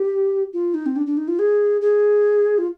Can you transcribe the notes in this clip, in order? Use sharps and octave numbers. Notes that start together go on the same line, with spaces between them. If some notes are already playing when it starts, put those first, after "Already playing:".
Already playing: G4
F4
D#4
C4
D4
D4
D#4
F4
G#4
G#4
F4